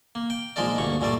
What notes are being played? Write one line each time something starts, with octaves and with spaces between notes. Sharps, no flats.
A#3
G5
A#1 F3 G#3 D#4 A#4 D5
D2 G2 A#3 C#6
G2 A#2 G3 A3 D5